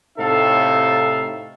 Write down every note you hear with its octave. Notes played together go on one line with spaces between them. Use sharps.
A2 C3 D#4 A4 E5 F5